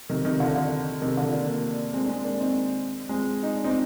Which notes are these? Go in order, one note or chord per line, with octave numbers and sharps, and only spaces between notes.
C3 D#3
C3 D#3
D3
D3
C3 D#3
D3 F3
A#3 D4
A#3 D4
G#3 C4
D4
G#3 C4
A#3 D4
C4 D#4
G#3 C4
D#4
D4
C4 D#4